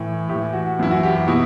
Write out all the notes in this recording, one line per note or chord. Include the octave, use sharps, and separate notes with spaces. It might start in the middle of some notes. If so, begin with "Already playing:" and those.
Already playing: A2 E3
A2 E3 G4
F#4
F#2 E3 E4
F#4
G4
F#4
B2 E4